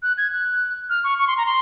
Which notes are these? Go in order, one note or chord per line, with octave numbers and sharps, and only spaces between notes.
F#6
G#6
F#6
F6
C#6
C#6
C6
A#5
C6